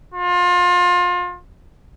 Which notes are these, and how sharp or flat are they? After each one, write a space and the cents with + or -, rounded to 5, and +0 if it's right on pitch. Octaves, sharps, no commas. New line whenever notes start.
F4 +30